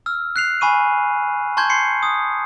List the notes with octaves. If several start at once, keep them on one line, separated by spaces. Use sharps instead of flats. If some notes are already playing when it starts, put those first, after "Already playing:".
E6 F6
F#6 C7 F7
G#5 B5 C#6 D#7
A5 C6 C#6 G6 G#6
C6 C7 C#7
D#6